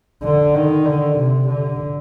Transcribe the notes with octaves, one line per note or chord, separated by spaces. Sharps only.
D3
D#3
D3
C3
D3